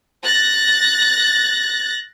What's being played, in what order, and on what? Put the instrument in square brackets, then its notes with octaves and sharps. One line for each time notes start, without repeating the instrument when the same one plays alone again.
[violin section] F#6 A6 A#6